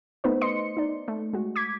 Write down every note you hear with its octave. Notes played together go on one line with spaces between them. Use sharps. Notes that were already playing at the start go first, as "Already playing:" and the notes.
A3 B3 D#4 B4 C5
D#5 C6 C#7
D#4 D5
A3
G#3 F#4
D6 G#6 B6